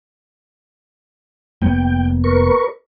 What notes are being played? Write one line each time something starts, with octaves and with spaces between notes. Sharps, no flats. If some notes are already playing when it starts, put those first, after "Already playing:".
F1 A#3 B3 G5
A#4 B4 C#6